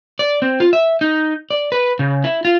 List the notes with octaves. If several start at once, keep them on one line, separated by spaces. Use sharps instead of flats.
D5
C4
F4
E5
D#4
D5
B4
C#3
E4
F4